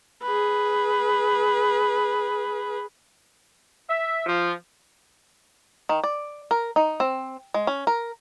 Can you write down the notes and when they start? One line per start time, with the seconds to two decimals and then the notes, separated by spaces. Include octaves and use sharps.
0.23 G#4 B4
3.89 E5
4.26 F3
5.89 D#3
6.04 D5
6.51 A#4
6.76 D#4
7.00 C4
7.54 G#3
7.67 C#4
7.87 A#4